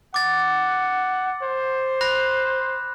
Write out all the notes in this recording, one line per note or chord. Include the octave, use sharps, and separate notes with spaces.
F#5 D6 A6
C5
B5 F#6 A#6